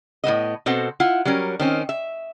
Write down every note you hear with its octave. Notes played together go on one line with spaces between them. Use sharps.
A2 A3 B3 D#5
B2 C4 A4 C5 F#5
E4 F4 F#5
F#3 G3 C#4 A#4
D#3 C4 C#4
E5